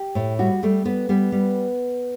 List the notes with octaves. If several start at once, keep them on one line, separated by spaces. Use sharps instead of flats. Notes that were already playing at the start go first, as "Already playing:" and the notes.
Already playing: G4
A2
G3 F#4
G3 A3
G3 B3
G3 B3
G3